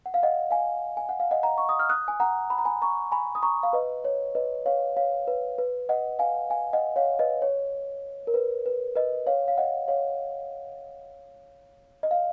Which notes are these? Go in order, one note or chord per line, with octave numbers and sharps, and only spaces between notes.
F#5
F5
D#5 F#5
F5 G#5
G#5
F#5
F5
D#5 F#5
F#5 A#5
C#6
D#6
F6
D#6 F#6
G#5
F#5 A#5
B5
A#5
G#5 B5
A#5 C#6
G#5 B5
D#6
A#5 C#6
F5
B4 D#5
C#5
B4 D#5
C#5 F5
C#5 F5
B4
B4
D#5 F#5
F5 G#5
F5 G#5
D#5 F#5
C#5 F5
B4 D#5
C#5
A#4
B4
B4
B4 D#5
C#5 F5
F5
D#5 F#5
C#5 F5
D#5
F5